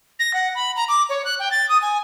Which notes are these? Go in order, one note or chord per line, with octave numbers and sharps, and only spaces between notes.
A#6
F#5
B5
A#5
D6
C#5
F#6
G5
A6
D#6
G#5